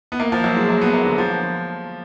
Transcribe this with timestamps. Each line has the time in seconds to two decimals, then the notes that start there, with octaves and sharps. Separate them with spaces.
0.12 B3
0.20 A#3
0.32 F3
0.44 F#3
0.56 G#3
0.69 A#3
0.81 B3
0.93 A#3
1.05 D3
1.18 F3